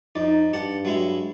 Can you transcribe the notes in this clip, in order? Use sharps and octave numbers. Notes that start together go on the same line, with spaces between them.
F2 D#4 D5
G2 G4 F#5 A5
F#3 G#3 E4